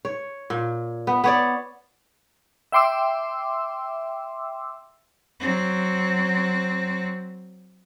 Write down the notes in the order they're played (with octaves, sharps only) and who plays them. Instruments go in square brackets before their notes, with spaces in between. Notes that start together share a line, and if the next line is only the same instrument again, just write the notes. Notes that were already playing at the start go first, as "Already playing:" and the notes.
[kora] C#5
A#2
B3
B3 C#5 D5
[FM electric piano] E5 G5 C6 D6 E6
[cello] F#3 C4